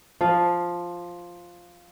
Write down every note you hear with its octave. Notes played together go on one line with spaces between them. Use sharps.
F3 F5